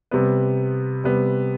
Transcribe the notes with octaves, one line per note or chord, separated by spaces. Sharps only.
C3 G3 B3
C3 G3 B3